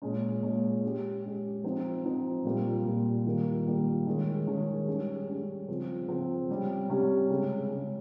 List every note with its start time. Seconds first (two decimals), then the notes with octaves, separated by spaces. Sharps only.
0.02 A#2 G#3 C#4
0.43 A#2 G#3 C#4
0.83 G#3 C#4 G4
1.23 G#3 C#4 G4
1.63 F3 C4 D#4
2.04 F3 C4 D#4
2.45 A#2 G3 A#3 F4
2.85 A#2 G3 A#3 F4
3.26 D#3 G3 A#3 F4
3.66 D#3 G3 A#3 F4
4.06 D#3 G#3 C#4 G#4
4.47 D#3 G#3 C#4 G#4
4.88 G3 C#4 G#4
5.28 G3 C#4 G#4
5.68 C#3 F3 C4 F4
6.08 C#3 F3 C4 F4
6.49 C3 G3 C#4 G4
6.89 C3 G3 C#4 G4
7.30 C#3 G#3 C#4
7.70 C#3 G#3 C#4